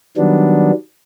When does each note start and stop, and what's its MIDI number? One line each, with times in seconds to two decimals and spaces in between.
0.17 0.71 51
0.17 0.71 54
0.17 0.71 55
0.17 0.71 59
0.17 0.71 62